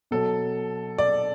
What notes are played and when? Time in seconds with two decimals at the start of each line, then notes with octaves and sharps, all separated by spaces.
0.11 B2 F#3 A4
0.98 D5